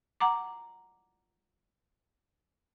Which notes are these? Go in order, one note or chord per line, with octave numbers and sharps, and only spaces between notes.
F#5 A#5 D6